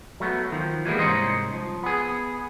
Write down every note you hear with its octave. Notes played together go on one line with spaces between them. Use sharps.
F#3 A3 B3
D#3 F3
E3 G3 G#3 A#3 B3
C2 G#2 C#4 D#4 C5 D#5
F3
B3 G#4